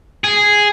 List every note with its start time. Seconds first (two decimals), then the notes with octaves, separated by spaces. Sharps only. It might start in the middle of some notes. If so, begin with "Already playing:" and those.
0.24 G#4